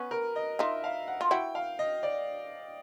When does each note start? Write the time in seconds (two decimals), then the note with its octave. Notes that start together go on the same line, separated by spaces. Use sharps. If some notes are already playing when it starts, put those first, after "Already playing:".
Already playing: B3 C#4 B4
0.11 A#4
0.36 D#5
0.59 D#4 F4 E5
0.84 F5
1.08 F#5
1.21 F4
1.31 E4 F#4 G5
1.55 F5
1.79 D#5
2.03 D5